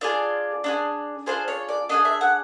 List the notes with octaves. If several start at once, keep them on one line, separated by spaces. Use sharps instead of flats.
D4 F4 G#4 D5
D4 F4 G#4
D4 F4 G#4 C5
C#5
D5
D4 F4 G#4 D#5
E5
F#5